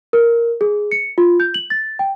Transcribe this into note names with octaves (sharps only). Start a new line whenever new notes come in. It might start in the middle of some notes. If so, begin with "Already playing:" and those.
A#4
G#4
C#7
F4
G6
F#7
A6
G5